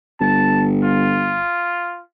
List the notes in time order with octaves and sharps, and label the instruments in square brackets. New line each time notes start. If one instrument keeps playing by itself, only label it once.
[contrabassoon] G1 [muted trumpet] A5
[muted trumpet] F4